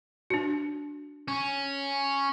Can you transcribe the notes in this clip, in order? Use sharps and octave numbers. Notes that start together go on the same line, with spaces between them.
D4 F#4
C#4